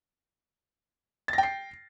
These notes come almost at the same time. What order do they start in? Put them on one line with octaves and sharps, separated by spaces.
A6 A#6 G5 C7